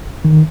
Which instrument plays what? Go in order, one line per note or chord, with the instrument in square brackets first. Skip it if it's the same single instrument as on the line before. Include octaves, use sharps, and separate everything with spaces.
[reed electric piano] D#3